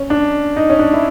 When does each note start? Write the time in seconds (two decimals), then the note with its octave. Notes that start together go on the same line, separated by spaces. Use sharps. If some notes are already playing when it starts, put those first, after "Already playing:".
Already playing: C#4
0.10 D4
0.56 D#4
0.70 C#4
0.79 D4
0.93 E4